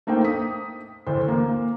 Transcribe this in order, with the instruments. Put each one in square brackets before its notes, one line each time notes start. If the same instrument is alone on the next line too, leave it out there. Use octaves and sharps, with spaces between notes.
[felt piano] A3 A#3 D#4 C5 G5
D#6 B6
A1 D2 C5
A#3